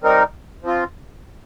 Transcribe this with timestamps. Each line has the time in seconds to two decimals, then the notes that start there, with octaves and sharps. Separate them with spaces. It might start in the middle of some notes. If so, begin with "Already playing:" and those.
0.02 G3 C4 D#4 A#4
0.62 F3 C4 F4